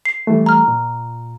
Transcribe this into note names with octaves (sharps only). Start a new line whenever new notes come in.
C7
E3 G3 A3
A#5 F6
A#2